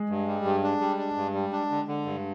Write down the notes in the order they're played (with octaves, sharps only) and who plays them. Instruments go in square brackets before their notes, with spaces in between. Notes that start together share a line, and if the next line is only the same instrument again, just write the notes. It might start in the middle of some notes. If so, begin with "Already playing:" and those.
Already playing: [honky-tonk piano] G#3
[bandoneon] G2
G3
G2
D4
G3
D4
G2
G3
D4
D3
D3
G2